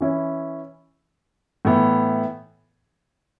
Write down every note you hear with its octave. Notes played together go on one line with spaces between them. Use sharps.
E3 C#4 E4
A2 E3 B3